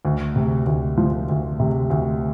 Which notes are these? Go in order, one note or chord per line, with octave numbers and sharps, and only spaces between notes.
D2
C3
D2
F3
D2
C3
D2